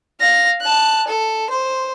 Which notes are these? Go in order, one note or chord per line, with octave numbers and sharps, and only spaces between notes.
F5 A#6
A5 F#6
A4
C5